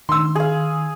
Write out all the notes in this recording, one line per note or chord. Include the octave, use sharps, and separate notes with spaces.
D#3 C6 E6
G#4 F5